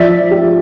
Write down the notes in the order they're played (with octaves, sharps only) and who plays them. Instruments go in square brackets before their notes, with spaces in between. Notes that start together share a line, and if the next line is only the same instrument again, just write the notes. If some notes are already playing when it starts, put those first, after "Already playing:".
Already playing: [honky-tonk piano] F3 [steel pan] D5 E5
[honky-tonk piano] G4